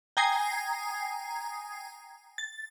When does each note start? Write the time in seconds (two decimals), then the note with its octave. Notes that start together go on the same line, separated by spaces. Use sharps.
0.17 G5 G#5 A#5 D#6 G#6 C7
2.38 A6